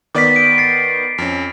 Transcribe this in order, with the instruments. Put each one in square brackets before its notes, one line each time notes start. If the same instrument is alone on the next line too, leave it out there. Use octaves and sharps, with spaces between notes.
[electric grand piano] D#3 B3 D5 [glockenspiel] D6 B6
[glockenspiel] D7
A6 C7
[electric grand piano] F2 C#4